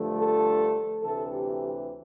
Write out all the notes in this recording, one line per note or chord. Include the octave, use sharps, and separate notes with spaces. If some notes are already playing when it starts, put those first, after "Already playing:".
Already playing: G2 D3 F3 A3
A4
D2 C3 E3 A4
G4